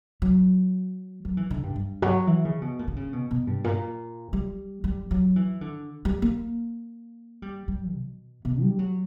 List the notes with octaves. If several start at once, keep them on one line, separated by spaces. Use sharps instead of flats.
F#3
F#3
E3
D3
G2
G2
F#3
E3
C#3
B2
A#2
D3
C#3
B2
B2
G2
A#2
G3
G3
F#3
E3
D3
G3
A#3
G3
G3
B2
B2
G3
F#3